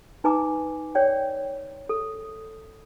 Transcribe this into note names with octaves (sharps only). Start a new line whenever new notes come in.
D#4 B4 G#5 A#5 D6
C#5 D5 G5
A4